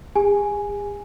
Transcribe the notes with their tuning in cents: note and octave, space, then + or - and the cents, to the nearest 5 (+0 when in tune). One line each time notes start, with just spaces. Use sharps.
G#4 -45 G#5 +0